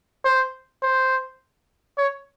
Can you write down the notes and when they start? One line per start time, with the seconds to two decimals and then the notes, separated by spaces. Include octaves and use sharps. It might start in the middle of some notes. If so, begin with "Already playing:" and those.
0.25 C5
0.83 C5
1.98 C#5